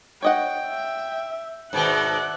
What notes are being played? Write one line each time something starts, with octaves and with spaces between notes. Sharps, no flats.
C#5 D#5 F#5 G5
E5
G#2 B2 D#3 D5 E5 F#5 F#6